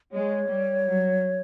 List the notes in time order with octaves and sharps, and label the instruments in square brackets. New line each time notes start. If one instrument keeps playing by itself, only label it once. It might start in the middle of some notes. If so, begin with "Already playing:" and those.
[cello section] G#3 [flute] C#5
[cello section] G3
F#3